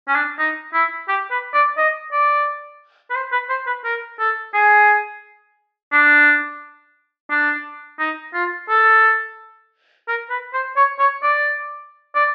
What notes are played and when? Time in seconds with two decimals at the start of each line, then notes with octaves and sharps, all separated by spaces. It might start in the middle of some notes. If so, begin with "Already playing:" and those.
0.08 C#4
0.15 D4
0.39 D#4
0.74 E4
1.08 G4
1.31 B4
1.54 D5
1.78 D#5
2.12 D5
3.10 B4
3.15 C5
3.32 B4
3.50 C5
3.67 B4
3.84 A#4
4.20 A4
4.54 G#4
5.92 D4
7.30 D4
8.00 D#4
8.34 F4
8.69 A4
10.08 A#4
10.30 B4
10.54 C5
10.77 C#5
10.99 C#5
11.23 D5
12.15 D5